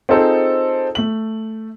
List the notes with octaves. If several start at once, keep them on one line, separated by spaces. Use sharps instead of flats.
C4 D#4 F4 G#4 A4 C5
A3 F#7